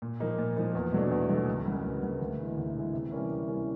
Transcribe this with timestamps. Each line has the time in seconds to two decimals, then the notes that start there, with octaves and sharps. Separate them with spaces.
0.02 A#2
0.20 F3 A#3 D#4
0.38 A#2
0.57 F3 A#3 D#4
0.75 E2
0.92 B2 F#3 A3 D4
1.11 E2
1.29 B2 F#3 A3 D4
1.47 C#2
1.66 C#3 F#3 A#3
1.84 C#2
2.02 C#3 F#3 A#3
2.21 D2
2.39 C3 E3 G#3
2.57 D2
2.75 C3 E3 G#3
2.93 C3
3.12 E3 G3 A#3 C#4
3.30 C3
3.48 E3 G3 A#3 C#4